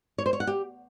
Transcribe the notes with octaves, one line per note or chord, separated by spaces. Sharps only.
C#5
C5
C#5
F#5
G4